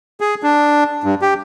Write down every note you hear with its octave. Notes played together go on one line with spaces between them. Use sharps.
G#4
D4
G2
G4